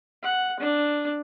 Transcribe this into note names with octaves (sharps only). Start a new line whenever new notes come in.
F#5
D4